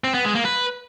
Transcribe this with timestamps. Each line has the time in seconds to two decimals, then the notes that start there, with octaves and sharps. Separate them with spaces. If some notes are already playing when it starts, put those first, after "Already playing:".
0.04 C4
0.14 B3
0.25 G#3
0.35 A#3
0.45 B4